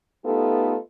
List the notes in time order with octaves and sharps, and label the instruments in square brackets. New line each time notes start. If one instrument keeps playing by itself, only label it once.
[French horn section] A3 B3 D#4 F4 G4 A4